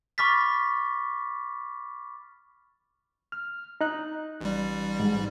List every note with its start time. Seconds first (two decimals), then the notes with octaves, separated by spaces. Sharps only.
0.18 B5 C#6 D6 F6 A6 B6
3.32 F6
3.81 D#4 F#6
4.41 A1 G3
5.00 G#2